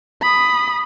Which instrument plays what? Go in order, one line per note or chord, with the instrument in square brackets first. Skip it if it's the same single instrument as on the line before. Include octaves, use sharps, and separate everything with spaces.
[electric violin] B5 D#6